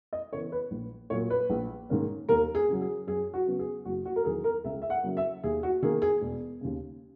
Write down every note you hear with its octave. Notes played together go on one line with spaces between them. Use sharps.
D#5
C#3 E3 B3 C#5
B4
A#1
A#2 F#3 A#3 C#5
B4
A#1
G#2 D#3 A#3 C#4
D#2 A#4
G#4
C#3 F#3
G#4
F#2 G#4
F#4
C#3 F#3 B3
G#4
F#1 F#4
F#4
A#4
E2 D#3 F#3 B3 G#4
A#4
C#2 E5
E5
F#5
C#3 F#3 A#3
E5
D#2 G#4
F#4
D#3 A#3 G#4
G#4
E1
D#2 C#3